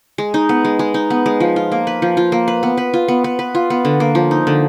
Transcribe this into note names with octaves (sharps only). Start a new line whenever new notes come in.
G#3
D#4
B3
G#3
G#3
D#4
B3
G#3
F3
F4
A#3
B4
F3
F4
A#3
B4
B3
B4
F4
B3
B3
B4
F4
B3
D3
A#3
F3
D#4
D3